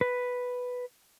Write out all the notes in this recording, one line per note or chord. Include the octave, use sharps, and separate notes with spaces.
B4